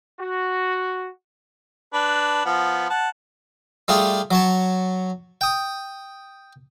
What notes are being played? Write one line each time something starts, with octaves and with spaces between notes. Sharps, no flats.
F#4
D4 B4
F3 B3
F#5 A5
G3 A3 F4 G4 G#4
F#3 C#5 A5
G5 D#6